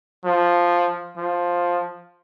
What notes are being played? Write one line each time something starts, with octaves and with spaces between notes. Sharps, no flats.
F3
F3